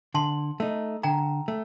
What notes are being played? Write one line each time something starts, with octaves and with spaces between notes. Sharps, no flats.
D3 A5 C6
A3 D#4
D3 G5 A#5
A3